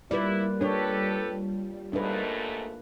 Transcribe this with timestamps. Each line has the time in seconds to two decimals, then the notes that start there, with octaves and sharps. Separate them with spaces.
0.11 A#2 G3 E4 B4 D5
0.61 D4 G4 A4 B4 C#5
1.93 D#2 G#2 A3 A#3 D4 D#4 B4 A5